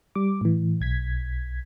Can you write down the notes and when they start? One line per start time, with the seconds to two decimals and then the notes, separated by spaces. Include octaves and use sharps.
0.15 G3 D6
0.41 A2 E3
0.80 B1 G#6 B6